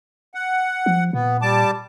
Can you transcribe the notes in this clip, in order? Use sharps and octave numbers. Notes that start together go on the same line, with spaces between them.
F#5
F3
A#2 B3
G3 A5 D6